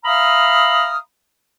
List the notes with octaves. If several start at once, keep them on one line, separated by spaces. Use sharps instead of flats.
E5 F5 A#5 B5 D#6 F6